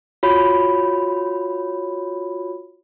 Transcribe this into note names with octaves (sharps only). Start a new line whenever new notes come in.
F4 F#4 C#5 B5